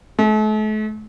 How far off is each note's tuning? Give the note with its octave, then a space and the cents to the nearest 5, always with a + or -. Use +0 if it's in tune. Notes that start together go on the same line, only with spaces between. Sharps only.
A3 -40